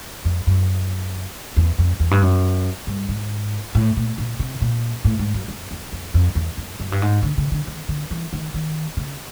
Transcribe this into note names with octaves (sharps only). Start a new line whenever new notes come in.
F2
F#2
E2
F2
E2
G2
F#2
G2
G#2
A2
A#2
A#2
C3
A#2
A2
G#2
F#2
F2
E2
F2
F2
E2
F2
F#2
G2
G#2
D3
C#3
D3
D#3
D3
E3
D#3
D#3
C#3